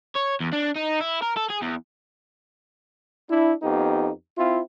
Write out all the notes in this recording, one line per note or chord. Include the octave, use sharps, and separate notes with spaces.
C#5
E2
D4
D#4
E4
A#4
A4
G#4
E2
D4 E4
F2 B3 D#4 G4
C4 E4 F4